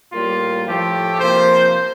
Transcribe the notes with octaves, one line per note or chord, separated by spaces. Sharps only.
A2 G3 A#3 F4
A2 F3 A3 G4
C3 F3 A#3 C5